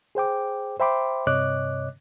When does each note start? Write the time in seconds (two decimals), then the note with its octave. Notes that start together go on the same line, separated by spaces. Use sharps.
0.15 G#4 C5 G5 D6
0.80 C5 E5 G5 B5 C6 D6
1.27 G2 C3 C#5 D#5 D6 F#6